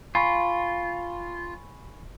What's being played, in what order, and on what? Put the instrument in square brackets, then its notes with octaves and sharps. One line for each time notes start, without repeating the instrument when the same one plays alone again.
[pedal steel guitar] F4 [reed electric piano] G#5 B5 C#6